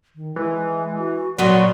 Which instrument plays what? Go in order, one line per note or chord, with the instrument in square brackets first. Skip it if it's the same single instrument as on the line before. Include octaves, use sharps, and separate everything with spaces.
[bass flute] D#3
[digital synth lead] E3 [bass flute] G#3
[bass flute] F#4
[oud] A#2 F#3 B3 [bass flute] D5 [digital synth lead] C6